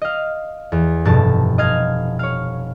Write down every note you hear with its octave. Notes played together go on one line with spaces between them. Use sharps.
D#5 F5
E2
F1 G2 B2 A5
D#5 F5 G#6
C#5 F5